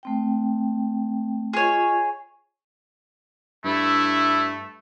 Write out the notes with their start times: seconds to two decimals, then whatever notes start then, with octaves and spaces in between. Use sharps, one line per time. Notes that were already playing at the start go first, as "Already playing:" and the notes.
0.03 A3 C4 G5
1.53 F4 G#4 C#5 D#5
3.65 G2 A3 E4